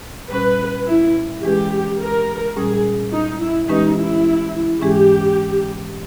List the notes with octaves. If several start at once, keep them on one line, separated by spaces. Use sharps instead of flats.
A#2 G3 C#4 B4
E4
E3 G#3 C#4 G4 G#4 B4
A#4
A#2 G3 C#4 G#4
D#4
E4
E3 G#3 C#4 D#4 G4 B4
E4
G#2 E3 G#3 C#4 G4 G#4